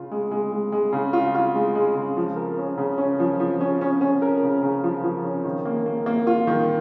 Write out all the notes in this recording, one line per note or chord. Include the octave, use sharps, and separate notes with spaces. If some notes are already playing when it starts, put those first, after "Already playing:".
Already playing: C#3 F4
G#3
G#3
G#3
G#3
C#3
F4
F4
G#3
G#3
C#3
F3
A#4
C#4
C#3
C#4
F3
F3
C#4
C#4
C#4
A#4
C#3
C#3
F3
F3
C#4
D#3
A#3
A#3
A#3
F4
D#3